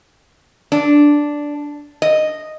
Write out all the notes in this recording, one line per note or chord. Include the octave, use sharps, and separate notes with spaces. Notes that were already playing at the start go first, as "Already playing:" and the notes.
D4
D#5